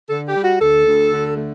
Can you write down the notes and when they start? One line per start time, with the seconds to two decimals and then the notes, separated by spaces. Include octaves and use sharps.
0.09 D3 A4
0.27 G4
0.35 G3
0.44 F#4
0.61 D2 A4
0.86 D2
1.12 D3
1.37 A3